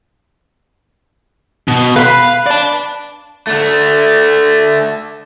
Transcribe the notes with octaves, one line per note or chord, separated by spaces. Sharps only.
B2
B4 F5 B5
D5 A5
D3 A3